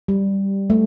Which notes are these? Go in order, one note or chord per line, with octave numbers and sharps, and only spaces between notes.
G3
A3